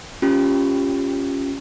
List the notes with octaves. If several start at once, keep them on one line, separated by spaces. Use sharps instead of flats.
C#4 F4 G4